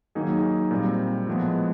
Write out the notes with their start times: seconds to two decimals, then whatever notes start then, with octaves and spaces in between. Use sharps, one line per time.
0.15 D#3 F#3 A#3 D#4 G#4
0.71 A#2 G3 C4
1.27 A2 F3 G#3 B3